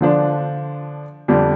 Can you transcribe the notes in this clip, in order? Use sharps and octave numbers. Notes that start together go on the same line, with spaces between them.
D3 F3 D4
F2 D3 G3 D4